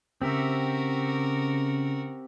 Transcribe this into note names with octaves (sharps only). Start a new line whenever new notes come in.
C#3 C4 F#4 G4 A#4 E5